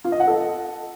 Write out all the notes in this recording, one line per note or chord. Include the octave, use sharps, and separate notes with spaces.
F4
D#5
F#5
A4